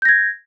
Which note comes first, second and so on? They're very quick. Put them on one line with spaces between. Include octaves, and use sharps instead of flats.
G6 A#6 G#6